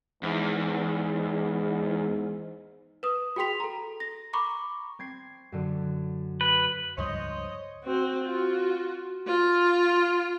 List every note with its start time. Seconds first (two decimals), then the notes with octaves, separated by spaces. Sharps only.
0.23 E2 G#2
3.03 B4 D#6
3.36 F#4 G#4 G5 C6 B6 F7
3.60 A4 A#5
4.00 A#6
4.33 A#5 B5 C#6 D6
4.99 C4 G#6 C7
5.52 F#2 D3
6.41 B4
6.98 C#2 G2 F3 C5 C#5 D#5
7.84 C4 F#4
8.24 F4 F#4
9.27 F4